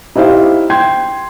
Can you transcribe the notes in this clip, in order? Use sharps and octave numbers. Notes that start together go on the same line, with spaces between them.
D#4 E4 G4 C5 F5
G5 C6 G6 G#6